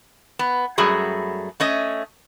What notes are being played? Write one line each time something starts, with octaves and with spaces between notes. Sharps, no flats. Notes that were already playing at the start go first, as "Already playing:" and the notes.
B3
F#2 G3 A3 F#4 G#4
A3 C#4 D#5